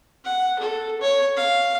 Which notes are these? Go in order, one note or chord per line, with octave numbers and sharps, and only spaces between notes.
F#5
A4
C#5
F5